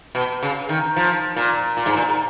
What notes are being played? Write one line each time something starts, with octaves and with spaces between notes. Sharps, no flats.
B2
C#3
D#3
F3
A#2
A#2
G#2
A#2